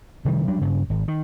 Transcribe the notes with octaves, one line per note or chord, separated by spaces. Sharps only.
C3 D#3 E3 G3
F#3 G3 D4
G2 C#3
G#1
D#3